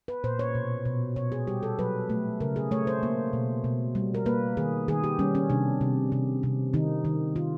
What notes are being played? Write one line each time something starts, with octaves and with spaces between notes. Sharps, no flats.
B4
A#2 C5
C#5
B2
B2
B2 C#5
G#4
G3 G4
A4
F#3 B4
A3
C#3 A#4
G#4
A3 C#5
C5
A#3
B2
B2
G3
A#4
A#3 B4
D#3 G#4
D#3 G#4
G4
G3 C#4
C#4
C3 D4
C3
C3
C3
D#3 D#4
D#3
D#3 F4